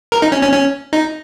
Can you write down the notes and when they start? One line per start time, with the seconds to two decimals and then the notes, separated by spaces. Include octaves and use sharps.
0.12 A#4
0.22 D#4
0.32 C#4
0.42 C#4
0.53 C#4
0.93 D#4